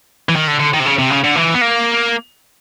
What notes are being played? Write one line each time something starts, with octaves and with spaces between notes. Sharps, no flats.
E3
D#3
D3
D3
D#3
C3
C#3
C3
C#3
D3
E3
B3
A#3